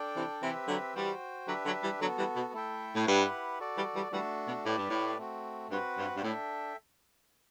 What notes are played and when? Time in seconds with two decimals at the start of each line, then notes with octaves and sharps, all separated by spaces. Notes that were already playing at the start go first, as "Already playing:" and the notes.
Already playing: D4 A4 D5 G5
0.15 C3 E3
0.42 C3 E3 C4 G4 B4 E5
0.68 D3 F#3
0.95 E3 G3 F#4 C5 G5
1.47 D3 F#3 D4 G4 B4 E5
1.65 D3 F#3
1.82 E3 G3
2.00 D3 F#3 B3 F#4 A4
2.18 E3 G3
2.35 B2
2.53 A3 E4 A4 E5 G5
2.95 A2
3.06 G2 E4 G4 B4 F#5
3.59 F#4 A4 D5
3.76 E3 G3
3.94 E3 G3
4.12 E3 G3 A3 D4 F#4 A4
4.47 B2
4.65 A2 G4 B4 D5
4.77 G2
4.89 A2
5.18 A3 C4 F#4
5.70 G2 C4 F#4 B4 F#5
5.97 G2
6.16 G2
6.23 A2 D4 A4 E5 G5